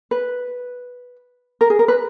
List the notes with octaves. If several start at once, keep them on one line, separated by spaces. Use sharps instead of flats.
B4
A#4
G#4
A#4
B4